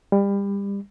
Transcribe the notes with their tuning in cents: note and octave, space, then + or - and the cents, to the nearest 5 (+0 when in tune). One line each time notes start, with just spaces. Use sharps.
G3 +30